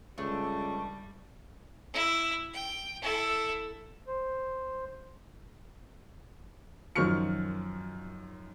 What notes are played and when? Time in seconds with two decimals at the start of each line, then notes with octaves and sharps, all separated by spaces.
0.18 C#2 G3 A3 D4 C#6
1.94 E4
2.53 G5
3.02 E4 A4
4.07 C5
6.96 F#2 D#3 F3 C#6 F6 C#7